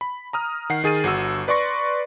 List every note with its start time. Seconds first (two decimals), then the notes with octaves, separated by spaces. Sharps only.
0.01 B5
0.33 A#5 D#6 F6
0.70 D#3 F#5 C7
0.84 D#3 G#4 A6 D#7
1.04 G1 F#4 E6
1.48 B4 D5 C6 C#6 A#6